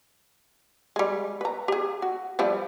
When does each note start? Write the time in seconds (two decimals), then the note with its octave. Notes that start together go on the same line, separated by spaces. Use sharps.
0.96 G3 G#3
1.41 B4 A#5
1.68 G4 G#4
2.02 F#4
2.39 F3 G3 E4